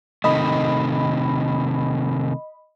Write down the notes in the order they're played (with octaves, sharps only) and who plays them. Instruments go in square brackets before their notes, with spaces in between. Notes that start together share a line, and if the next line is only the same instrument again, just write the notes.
[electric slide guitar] C3 D#3 A3 [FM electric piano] D#5 B5